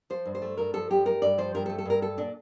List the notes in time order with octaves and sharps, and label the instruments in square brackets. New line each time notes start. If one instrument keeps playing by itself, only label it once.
[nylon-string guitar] F3 C5
G2
C5
A3
G2 A#4
F3 A4
G2 G4
A3 A#4
G2 D5
F3 C5
G2 A#4
A4
A3
A4
G2 A#4
A3 A4
A#2 D4